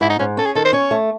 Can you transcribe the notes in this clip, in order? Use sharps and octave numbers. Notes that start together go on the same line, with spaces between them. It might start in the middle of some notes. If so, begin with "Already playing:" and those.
G#2 E4
D#4
G#2 C#4
C#4 A4
G#4
D#3 A4
C5
C#4 C#5
A3